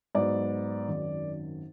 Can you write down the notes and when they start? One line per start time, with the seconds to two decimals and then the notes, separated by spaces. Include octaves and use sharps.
0.15 G#2 F#3 B3 D5
0.88 G#1 F#2 D#3